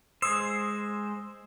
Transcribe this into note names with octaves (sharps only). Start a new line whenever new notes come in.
G#3 C5 D#6 E6